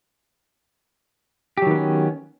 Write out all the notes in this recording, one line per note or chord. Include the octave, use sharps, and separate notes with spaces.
D#3 F#3 B3 C#4 G4